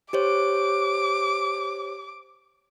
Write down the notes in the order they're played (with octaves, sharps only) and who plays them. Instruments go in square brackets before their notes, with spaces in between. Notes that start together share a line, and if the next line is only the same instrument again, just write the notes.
[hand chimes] G4 C5 C#5 [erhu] D6